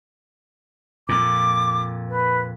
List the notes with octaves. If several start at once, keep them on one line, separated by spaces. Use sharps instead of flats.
F2 A#2 D6
B4